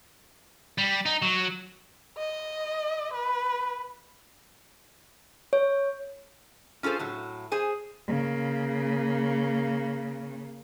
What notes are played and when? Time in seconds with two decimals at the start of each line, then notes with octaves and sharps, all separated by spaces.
0.78 G3
1.06 D#4
1.22 F#3
2.18 D#5
3.13 B4
5.53 C#5
6.83 C#4 F4 G#4 A4 C5
6.99 A2 F#3
7.52 G#4 C5 G#5
8.08 C#3 A#3